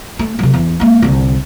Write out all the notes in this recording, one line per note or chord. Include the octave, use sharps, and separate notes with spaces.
A3
C3 F#3
E2
G#3 A#3
C2 D3